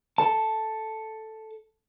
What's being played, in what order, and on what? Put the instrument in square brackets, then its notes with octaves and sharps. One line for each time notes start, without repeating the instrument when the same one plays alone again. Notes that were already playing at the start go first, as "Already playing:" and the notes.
[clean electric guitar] A4 A5